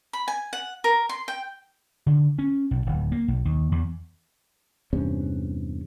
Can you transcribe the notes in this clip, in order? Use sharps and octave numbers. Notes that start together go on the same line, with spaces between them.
B5
G#5
F#5
A#4
C6
G5
D3
C#4
B1
D1
A#3
B1
D#2
E2
E2 G2 C3 C#4